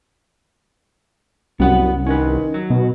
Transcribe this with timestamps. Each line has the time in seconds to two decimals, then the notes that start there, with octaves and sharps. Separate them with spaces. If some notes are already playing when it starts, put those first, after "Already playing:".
1.60 C2 F#2 B3 F#5
2.07 D#3 C#4 B4
2.54 F#3
2.70 B2